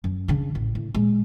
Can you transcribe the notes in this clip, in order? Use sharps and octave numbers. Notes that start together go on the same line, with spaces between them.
F#2
C#3 D4
A1
A2
A#2 G#3